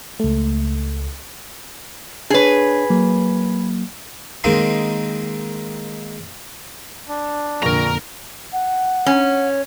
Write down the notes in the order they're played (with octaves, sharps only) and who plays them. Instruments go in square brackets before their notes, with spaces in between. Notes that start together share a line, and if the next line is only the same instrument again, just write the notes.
[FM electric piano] C#2 A3
[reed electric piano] D4 C#5 [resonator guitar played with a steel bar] G#4 B4
[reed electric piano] F#3 A#3
[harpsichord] D#3 G#3 A#3 C4 D#4
[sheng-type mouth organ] D4
[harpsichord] A#1 [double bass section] F2 D3 A#3 [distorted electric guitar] A#4 A#5
[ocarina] F#5
[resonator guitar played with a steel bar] C#4